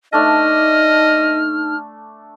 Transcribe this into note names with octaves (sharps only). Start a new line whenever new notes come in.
A3 D4 D#4 A4 D#5 F6